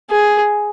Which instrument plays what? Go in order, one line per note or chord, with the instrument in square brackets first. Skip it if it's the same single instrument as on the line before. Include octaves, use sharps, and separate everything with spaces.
[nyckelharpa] G#4